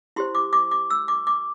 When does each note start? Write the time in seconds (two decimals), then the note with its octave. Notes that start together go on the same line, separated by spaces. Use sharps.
0.16 E4 G4 C5 C6
0.35 D6
0.53 D6
0.71 D6
0.90 E6
1.08 D6
1.27 D6